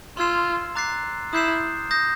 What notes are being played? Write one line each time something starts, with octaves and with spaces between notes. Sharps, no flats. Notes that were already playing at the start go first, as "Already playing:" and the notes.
F4 C6 E6 G#6 C7 E7
A#5 D6 F#6 A6 C7
E4 D#6 G6 C7 E7
D#6 G6 A#6